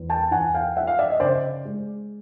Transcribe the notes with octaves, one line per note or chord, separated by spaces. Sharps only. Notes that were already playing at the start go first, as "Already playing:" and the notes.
Already playing: E2
G5 A5
E2 F#5 G#5
F5 G5
F3 E5 F#5
F5
D5 E5
D#5
C#3 C5 D5
G#3